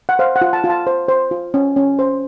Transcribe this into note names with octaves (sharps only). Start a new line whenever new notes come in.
F#5
C5 F5
F#5
F4
A5
F4
A5
C5
C5
F4
C#4
C#4
C5